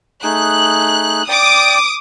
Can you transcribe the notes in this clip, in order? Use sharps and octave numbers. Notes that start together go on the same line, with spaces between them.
A3 D#4 G#4 F#6
D5 G5 D6 D#6